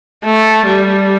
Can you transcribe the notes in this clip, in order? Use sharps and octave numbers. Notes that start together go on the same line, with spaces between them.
A3
G3